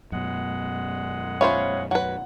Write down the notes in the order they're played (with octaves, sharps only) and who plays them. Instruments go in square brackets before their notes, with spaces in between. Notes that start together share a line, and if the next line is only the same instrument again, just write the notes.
[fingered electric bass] F#2 B2 [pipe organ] G#3 F#5
[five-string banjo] C#4 F4 C5 [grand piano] C#5 E5 B5
[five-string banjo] F#3 B4 [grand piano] F#5